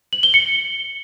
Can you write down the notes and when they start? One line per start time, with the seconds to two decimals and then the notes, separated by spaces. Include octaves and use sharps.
0.13 F#7
0.23 G7
0.34 C#7